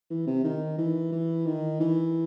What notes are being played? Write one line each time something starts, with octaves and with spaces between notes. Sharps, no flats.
E3
C3
D#3
E3
E3
D#3
E3